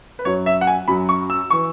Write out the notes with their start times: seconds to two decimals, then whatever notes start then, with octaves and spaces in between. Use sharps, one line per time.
0.19 B4
0.25 F#2 F#3 C#5
0.46 E5
0.61 F#5
0.67 G#5
0.88 F#2 F#3 B5
1.09 C#6
1.30 E6
1.50 E3 C#6